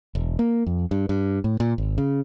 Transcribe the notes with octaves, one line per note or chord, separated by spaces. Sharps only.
E1
A#3
F2
G2
G2
A2
A#2
G#1
C#3